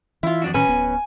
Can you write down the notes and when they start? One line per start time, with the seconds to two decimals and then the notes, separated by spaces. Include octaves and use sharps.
0.23 E3 E4 F4
0.42 F2 D4 F#4
0.54 A2 D#3 F#3 C#4 B4 G#5
0.68 D1 B3